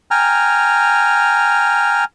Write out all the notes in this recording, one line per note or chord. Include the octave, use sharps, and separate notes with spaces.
G5 G#5 A#5 F6